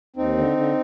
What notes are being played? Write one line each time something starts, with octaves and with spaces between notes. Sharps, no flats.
D#2 C4 D#4
D3
D3